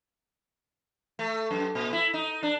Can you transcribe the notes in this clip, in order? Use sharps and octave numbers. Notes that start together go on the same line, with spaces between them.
A3
F#2
A#2
E4
D#4
D4